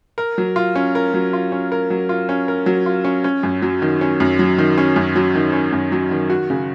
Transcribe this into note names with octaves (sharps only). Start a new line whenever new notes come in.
A#4
F#3
F4
C#4
A#4
F#3
F4
C#4
A#4
F#3
F4
C#4
A#4
F#3
F4
C#4
C#4
F#2
F#3
D#3
C#4
F#2
F#3
D#3
C#4
F#2
F#3
D#3
C#4
F#2
F#3
D#3
F#4
C#3